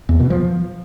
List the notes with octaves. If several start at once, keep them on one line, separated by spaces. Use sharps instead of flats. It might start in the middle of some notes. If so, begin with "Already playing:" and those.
E2
B2
F3